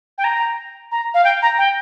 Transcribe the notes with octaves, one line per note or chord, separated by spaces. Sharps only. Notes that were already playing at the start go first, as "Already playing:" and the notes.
G5
A#5
A#5
F5
G5
A#5
G5